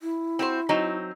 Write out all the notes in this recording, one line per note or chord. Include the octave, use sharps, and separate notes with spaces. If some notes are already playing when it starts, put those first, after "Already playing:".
E4
C4 F#4 C5
F#3 C4 D#4